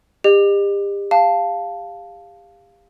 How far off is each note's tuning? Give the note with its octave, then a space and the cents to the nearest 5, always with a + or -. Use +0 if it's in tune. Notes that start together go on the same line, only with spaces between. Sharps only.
G4 +35 D#5 -35
F5 +0 A5 +0